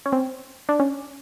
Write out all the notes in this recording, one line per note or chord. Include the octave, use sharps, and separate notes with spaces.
C#4
C4
D4
C#4